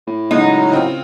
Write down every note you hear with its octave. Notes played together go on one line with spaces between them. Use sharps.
A2
C#3 F#3 G#3 D#4
C#3 C4 F4